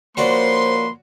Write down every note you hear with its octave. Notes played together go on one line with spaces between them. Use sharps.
F3 A#3 C#4 F#4 B4 C5 D5 C6